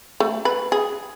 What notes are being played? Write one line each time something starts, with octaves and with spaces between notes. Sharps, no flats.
A3
B4
G#4